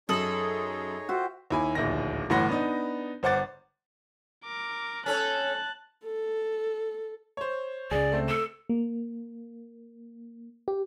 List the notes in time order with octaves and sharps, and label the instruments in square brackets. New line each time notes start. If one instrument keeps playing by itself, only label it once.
[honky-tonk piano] F#2 D#6 F#7 [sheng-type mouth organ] D#4 G#4 C#5 [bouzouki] A4
[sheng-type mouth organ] F4 C5 [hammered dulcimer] F#4 E5 G5
[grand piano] D#2 E4 G#5
D1 A#1 D#2 A#6
G1 A2 E3 F#5 C6 A#6
B3 D4 D#4
G1 C5 F#5 D6 A6
[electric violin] A#4 D6
[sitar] C#4 A4 C#5 [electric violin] A5 F#6
[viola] A4
[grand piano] C5 C#5
[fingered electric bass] C#2 C#3 [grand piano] G#4 [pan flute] D5
[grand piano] A3 C4
[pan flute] A4 [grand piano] E7
[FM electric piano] A#3
G4